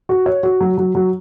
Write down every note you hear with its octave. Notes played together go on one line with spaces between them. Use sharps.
F#4
C#5
F#4
F#3
F#3
F#3